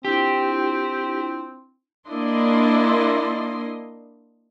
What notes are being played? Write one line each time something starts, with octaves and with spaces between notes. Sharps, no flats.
C4 D4 E4 F4 G4
A#3 D4 E4 D#5 C6